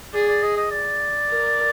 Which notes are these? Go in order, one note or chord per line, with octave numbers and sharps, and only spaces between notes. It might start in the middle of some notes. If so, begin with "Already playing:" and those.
G#4 D5
D5
D#5
D#5
D5
A#4